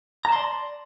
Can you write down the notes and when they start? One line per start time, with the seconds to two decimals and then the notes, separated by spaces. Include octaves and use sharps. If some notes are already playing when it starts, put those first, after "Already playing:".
0.25 A#5
0.29 A5
0.32 C6
0.36 D5